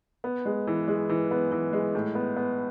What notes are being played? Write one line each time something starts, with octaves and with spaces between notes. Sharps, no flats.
B3
G#3
E3
G#3
E3
B3
E3
G#3
A2
B3
B3